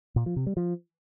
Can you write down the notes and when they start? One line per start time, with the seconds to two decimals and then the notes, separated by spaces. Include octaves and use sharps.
0.16 A#2
0.26 F3
0.36 C3
0.46 G3
0.57 F3